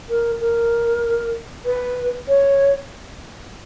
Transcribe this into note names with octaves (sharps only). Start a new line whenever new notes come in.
A#4
A#4
B4
C#5